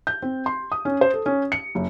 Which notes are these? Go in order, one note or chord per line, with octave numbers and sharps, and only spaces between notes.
G6
C4
C6
D#6
C#4
C5
A4
C#4
C#7
F#1